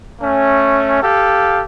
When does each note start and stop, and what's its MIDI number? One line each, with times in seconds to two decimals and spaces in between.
0.21 1.00 57
0.21 1.00 61
1.02 1.64 67
1.02 1.64 69
1.02 1.64 77